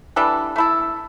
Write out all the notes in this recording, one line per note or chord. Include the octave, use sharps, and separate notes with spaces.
E3 G3 D4 A4
A3 E4 A4